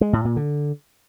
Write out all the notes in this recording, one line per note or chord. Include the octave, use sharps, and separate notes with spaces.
G#3
A2
A#2
D3